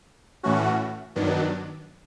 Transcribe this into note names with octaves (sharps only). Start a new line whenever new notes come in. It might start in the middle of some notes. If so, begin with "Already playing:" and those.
A2 E3 A3 C#4 F#4
G2 D#3 F#3 B3 D4